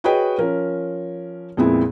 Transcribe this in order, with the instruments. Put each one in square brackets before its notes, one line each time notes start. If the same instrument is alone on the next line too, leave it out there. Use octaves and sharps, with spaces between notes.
[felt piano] F#4 G#4 B4 C#5 D#5 G5
F3 C#4 A#4
F2 A#2 G#3 B3 C4 E4